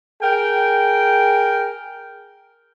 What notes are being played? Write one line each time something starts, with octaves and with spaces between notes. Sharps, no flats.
G#4 A#4 G5